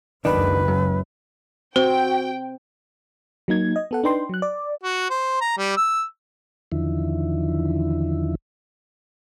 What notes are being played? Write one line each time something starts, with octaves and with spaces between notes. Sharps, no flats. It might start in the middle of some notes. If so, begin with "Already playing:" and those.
F#1 C#2 D#3 D4 B4
F#2
C4 F#4 C5 G5
F#3 A#3 D#4 G#6
D#5
B3 A4 F#5
D4 D#4 B4 G5 C6
F#3 F#6
D5
F#4
C5
A#5
G3
E6
E2 D3 D#3 F3 E4